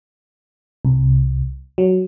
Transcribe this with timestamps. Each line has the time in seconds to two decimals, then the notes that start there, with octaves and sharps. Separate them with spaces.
0.85 C2
1.78 F#3